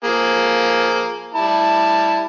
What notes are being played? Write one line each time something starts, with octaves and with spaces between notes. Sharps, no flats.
F3 A#3 G#4
G3 E4 A5